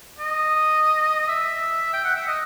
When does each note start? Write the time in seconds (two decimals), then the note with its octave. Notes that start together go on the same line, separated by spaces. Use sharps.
0.18 D#5
1.29 E5
1.93 G5
2.04 F#5
2.16 E5
2.27 D#5